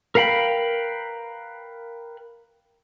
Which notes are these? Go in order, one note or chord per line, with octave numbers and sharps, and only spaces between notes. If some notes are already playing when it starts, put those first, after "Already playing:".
A#4 B4 F5 G5 B5